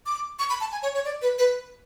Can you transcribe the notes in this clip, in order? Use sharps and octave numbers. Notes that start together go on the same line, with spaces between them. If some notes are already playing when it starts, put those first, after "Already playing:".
D6
C#6
B5
A5
G#5
C#5
C#5
D5
B4
B4